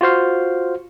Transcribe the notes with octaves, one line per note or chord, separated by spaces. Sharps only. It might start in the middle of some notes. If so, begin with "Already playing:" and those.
F4 F#4 C5 F5